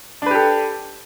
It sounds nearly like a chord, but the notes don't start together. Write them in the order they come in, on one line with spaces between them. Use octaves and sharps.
D4 B4 G4 A4